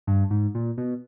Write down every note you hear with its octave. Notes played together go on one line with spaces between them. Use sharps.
G2
G#2
A#2
B2